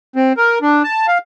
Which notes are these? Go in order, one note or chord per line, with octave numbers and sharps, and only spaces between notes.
C4
A#4
D4
A5
F5